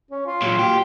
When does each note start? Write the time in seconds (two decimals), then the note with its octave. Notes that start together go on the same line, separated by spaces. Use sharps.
0.11 C#4
0.26 F4
0.42 A#2 F#3
0.59 G4